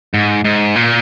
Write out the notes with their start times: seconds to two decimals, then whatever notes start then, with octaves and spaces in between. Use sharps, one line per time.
0.14 G#2
0.44 G#2
0.76 A#2